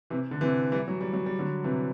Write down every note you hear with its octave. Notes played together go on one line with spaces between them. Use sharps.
C3 E3
D3
C3 E3
E3 G3
F#3
G3
F#3
G3
D3 F#3
C3 E3